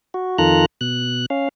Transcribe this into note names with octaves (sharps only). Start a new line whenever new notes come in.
F#4
F2 D#3 F4 A4 A#5 F#6
B2 F#6
C#4 F5